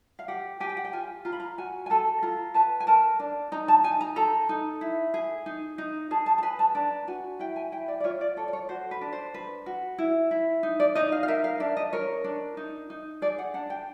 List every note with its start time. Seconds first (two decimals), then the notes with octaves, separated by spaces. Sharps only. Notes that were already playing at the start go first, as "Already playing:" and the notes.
0.19 F5
0.28 G4 F#5
0.60 G4 G#5
0.69 G5
0.77 F#5
0.84 G5
0.93 F4 G#5
1.25 F4 A#5
1.32 B5
1.40 A#5
1.58 F#4 G#5
1.86 G#5
1.90 A4 A5
2.23 F4 A#5
2.54 B4 A5
2.80 G#5
2.87 A#4 A5
3.20 D4
3.52 D#4 A#5
3.68 A5
3.84 D#4 G#5
4.01 A#5
4.16 A4 A#5
4.49 D#4
4.81 E4
5.14 G#4
5.46 D#4
5.78 D#4
6.11 G#4 A5
6.26 A5
6.38 A5
6.43 B4 G#5
6.59 A5
6.75 D4 A#5
7.08 F#4 G#5
7.39 E4 G5
7.56 G#5
7.72 E4 G5
7.88 D5
8.00 D5
8.04 F4 C#5
8.21 D5
8.37 A4 C#5
8.48 D5
8.53 C#5
8.69 F#4 C5
8.91 B4
9.01 D4
9.12 C5
9.34 B4
9.66 F#4
9.98 E4
10.31 E4
10.63 D#4
10.80 D5
10.95 D#4 D#5
11.12 F5
11.23 F5
11.28 A#4 E5
11.44 F5
11.60 D4 E5
11.77 D#5
11.93 A#4 C#5
12.24 D4
12.57 D#4
12.90 D#4
13.22 G#4 D5
13.39 F#5
13.54 D4 F#5
13.70 G5